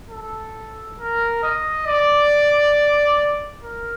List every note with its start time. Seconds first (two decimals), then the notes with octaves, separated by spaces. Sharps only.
0.10 A4
0.99 A#4
1.43 D#5
1.87 D5
3.63 A#4